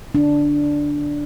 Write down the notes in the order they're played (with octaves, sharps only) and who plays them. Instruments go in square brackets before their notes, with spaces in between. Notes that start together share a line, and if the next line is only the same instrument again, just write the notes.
[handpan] D4